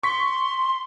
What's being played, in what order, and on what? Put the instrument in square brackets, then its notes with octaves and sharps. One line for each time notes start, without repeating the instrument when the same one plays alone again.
[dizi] C6 [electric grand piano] C#6 B6